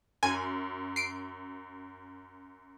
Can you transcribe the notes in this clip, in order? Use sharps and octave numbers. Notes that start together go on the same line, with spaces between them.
F#2 G#5
C7 D7